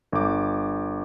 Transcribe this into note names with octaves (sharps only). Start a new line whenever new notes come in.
G1 D6